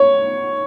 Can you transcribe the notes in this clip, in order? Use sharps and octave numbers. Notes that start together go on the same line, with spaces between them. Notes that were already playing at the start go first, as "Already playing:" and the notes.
Already playing: C#5